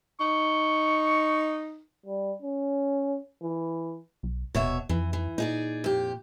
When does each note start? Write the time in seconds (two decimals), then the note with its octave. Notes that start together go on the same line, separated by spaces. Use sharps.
0.20 D#4 C#6
2.06 G3
2.42 C#4
3.43 E3
4.23 B1
4.55 D#1 B2 C#5 E5
4.89 F2 E3
5.13 E3
5.38 A#2 D#4 G#4 D5
5.84 F2 G4